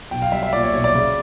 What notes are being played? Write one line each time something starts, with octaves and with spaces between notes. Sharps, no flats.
B1 G5
F5
G3 E5
E5
A#2 D5
C#5
B1 C#5
D5
C#3